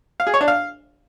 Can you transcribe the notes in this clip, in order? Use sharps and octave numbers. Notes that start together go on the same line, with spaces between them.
F5
G#4
C#5
D4
F5